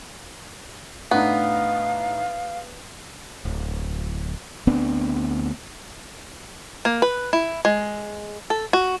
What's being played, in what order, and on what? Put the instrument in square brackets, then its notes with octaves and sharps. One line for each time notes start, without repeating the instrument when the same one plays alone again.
[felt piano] A2 D4 D#4 [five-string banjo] B3 [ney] F5
[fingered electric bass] D1
D2 B3 C4 D4
[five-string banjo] A#3
B4
E4
G#3
A4
F#4